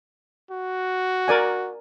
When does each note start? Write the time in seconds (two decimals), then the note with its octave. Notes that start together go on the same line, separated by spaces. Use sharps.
0.51 F#4
1.28 A#4 D5 G#5